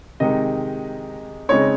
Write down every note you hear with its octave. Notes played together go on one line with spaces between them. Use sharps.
C3 D#3 G#3 D#4 D#5
C#3 G#3 C4 D#4 C#5